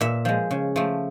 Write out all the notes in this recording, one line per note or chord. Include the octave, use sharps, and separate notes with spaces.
A#2 E5
F3 G#3
C#3
F3 A3